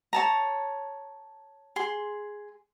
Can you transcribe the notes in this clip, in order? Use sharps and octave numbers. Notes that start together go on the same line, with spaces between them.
C#5 A5 A#5
G#4 C6